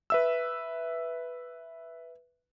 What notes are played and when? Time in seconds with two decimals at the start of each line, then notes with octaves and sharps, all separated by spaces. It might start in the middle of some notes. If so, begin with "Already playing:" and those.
0.10 B4 E5 E6